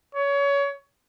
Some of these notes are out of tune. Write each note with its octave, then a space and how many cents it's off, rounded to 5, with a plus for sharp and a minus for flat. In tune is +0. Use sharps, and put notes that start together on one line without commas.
C#5 +25